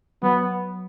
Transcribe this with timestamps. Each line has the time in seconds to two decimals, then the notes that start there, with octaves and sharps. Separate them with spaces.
0.23 F#3 B3